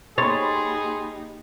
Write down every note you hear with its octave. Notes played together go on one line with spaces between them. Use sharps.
A#3 D#4 G4 G#4 C#5 B5 C6 A6